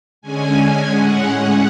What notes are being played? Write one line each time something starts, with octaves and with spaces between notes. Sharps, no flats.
D3 G#3 C#4 G#5
A2 G#3 C#4 F#5